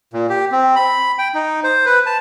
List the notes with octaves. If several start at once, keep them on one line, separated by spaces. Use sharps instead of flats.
A#2
G4
C4
B5
G5
D#4
C5
B4
A5